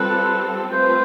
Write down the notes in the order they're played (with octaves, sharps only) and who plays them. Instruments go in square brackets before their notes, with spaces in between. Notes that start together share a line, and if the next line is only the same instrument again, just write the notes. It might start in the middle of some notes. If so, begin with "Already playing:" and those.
Already playing: [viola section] G3 C4 F4 A4 [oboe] B4
[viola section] A3 C4 F4 B4 [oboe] C5